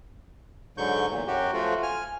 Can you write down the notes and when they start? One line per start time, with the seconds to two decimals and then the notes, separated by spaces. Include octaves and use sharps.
0.78 G#2 D3 F#3 C#6 G6
1.11 E2 A#2
1.27 F#2 F#3 F#4 G4
1.53 F3 A3 F4 F#4
1.83 G#5 F6